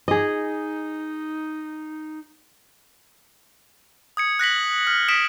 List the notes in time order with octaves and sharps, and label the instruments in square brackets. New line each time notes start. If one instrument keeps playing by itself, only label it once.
[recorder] D#4 [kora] G#4 D#5
[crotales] D#6 G#6 C#7
F#6 A#6 B6 F#7
F6
D#6 B6 D7 E7